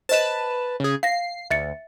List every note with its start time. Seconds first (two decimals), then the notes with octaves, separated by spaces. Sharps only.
0.09 B4 C5 D#5 A5 E7
0.80 C#3 G#4
1.03 F5 A#6 C7
1.50 D2 E5 A6 C#7